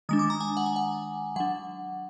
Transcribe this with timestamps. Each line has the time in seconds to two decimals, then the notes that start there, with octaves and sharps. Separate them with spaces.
0.09 D#3 G#3 D4 D#6
0.19 D6
0.30 A#5
0.41 G#5
0.57 F#5
0.66 G#5
0.76 F#5
1.36 F#3 D4 F#5